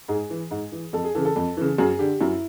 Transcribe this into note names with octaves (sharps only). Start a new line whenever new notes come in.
G#2 G#4
E3
G#2
E3
F2 A4
G#4
C#3 E3 A4
A4
F2
C#3 E3
F#2 G#4
D3 G4
F#2 E4